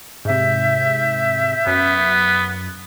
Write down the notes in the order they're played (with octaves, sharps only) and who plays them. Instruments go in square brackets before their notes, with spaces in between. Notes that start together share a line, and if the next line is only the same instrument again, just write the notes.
[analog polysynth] G#2 C3 [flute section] E5 G6
[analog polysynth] F#2 [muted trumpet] B3